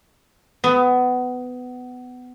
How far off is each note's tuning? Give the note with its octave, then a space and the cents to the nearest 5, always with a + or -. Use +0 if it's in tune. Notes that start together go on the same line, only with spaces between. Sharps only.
B3 +20